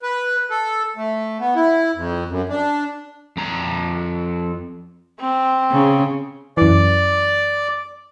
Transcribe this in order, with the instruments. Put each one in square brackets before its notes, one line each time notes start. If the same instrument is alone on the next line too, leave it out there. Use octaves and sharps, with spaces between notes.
[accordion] B4
A4
A3
B3
E4
F2
F#2
D4
[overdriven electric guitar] F2 A#5
[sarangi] C4
[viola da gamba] C#3
[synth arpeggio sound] F#2 E3 [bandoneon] D5